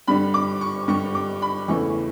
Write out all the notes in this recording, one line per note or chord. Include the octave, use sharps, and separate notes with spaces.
G2 D3 G3 B5
D6
C#6
G2 D3 G3 C#6
D6
B5
E2 C#3 E3 A3 C#6